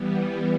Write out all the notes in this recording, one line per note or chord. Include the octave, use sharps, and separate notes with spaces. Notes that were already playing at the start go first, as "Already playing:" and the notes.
Already playing: E3 G3 B3